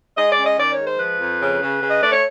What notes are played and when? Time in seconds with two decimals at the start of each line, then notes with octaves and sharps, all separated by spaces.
0.16 G#3 D#5
0.30 D5
0.37 C#4
0.44 D#5
0.57 D#3 D5
0.71 C#5
0.78 G#3
0.85 C5
0.98 F3 B4
1.20 F2
1.40 C#3
1.61 C#3
1.82 C#3
1.90 D#5
2.01 A3 D5
2.12 C#5